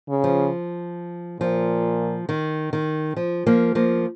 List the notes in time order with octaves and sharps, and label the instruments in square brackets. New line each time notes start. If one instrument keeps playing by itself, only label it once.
[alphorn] C#3
[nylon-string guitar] F3
[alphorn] A#2 [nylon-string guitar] F3
[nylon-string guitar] D#3
D#3
F3
F3 A#3
F3 A#3